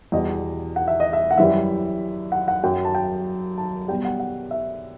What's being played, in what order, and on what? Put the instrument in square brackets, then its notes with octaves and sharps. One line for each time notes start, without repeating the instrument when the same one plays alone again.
[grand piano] E2 B2 G3 D#5
F#5
E5
D#5
E5
F#5
F#2 E3 G3 E5
F#5
F#5
F#2 F#3 G5
A5
G5
A5
B2 G3 G5
F#5
F#5
E5